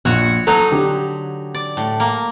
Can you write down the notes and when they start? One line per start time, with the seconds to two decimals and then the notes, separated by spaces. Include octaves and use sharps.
0.05 A#1 F#4 C#5 F#5
0.47 F#3 D#4 A4
0.72 D3 G4
1.54 D5
1.77 A2
2.00 A#3